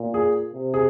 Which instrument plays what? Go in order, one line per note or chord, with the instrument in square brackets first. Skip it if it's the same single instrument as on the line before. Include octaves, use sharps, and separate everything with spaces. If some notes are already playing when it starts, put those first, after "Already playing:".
Already playing: [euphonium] A#2
[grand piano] G#4
[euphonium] C3
[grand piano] G#4